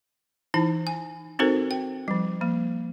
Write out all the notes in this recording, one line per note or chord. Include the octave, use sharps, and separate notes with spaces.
E3 D#4 E4 A5
G#5
C4 D#4 F#4 A4 A#4 C5
G5
F3 G3
F3 A#3